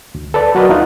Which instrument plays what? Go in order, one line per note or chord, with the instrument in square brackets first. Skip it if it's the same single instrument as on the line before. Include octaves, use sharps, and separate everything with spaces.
[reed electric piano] D2
A4 B4 D5
F#3 F#4 A#4 B4 D5 D#5
D2 D3 D#4 F4 F#6